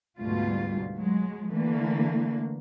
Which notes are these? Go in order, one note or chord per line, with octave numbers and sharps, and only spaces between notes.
D2 G#2 B2 G3 F4
F#3 G#3
D3 E3 A3 A#3